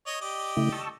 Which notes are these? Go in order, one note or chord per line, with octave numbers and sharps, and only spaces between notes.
C#5 D#5
G4 D5 D#5
C#3 A3 E4
A5 C#6 E6